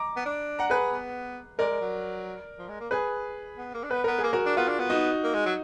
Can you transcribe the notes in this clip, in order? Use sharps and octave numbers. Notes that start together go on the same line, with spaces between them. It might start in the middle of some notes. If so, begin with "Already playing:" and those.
Already playing: A#5 D6
B3
D4
F#5 A#5
G#4 B4
B3
G#3 A#4 D5
G#3
F#3
F3
G#3
A#3
G#4 B4
B3
A#3
D4
B3 B4
B3 A#4
G#4
A#3
F#4 A#4
D4
B3 F4
D4
B3
D#4 F#4
A#3
G#3
F#3